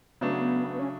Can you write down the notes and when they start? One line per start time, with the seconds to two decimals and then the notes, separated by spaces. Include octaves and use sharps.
0.21 C#3 F#3 A3 B3 D4
0.70 B3
0.79 C#4